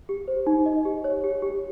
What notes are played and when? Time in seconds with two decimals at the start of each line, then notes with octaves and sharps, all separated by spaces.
0.09 G4
0.28 C5
0.47 D#4
0.66 D#5
0.85 G4
1.04 C#5
1.24 G4
1.42 G4